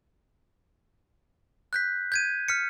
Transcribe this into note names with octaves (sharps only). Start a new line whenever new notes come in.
F#6 G6 B6
G6 G#6 D#7
F6 B6 C#7